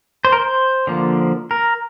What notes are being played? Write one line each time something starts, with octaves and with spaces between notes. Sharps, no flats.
C5
A#4
C5
D3 F3 A#3
A#4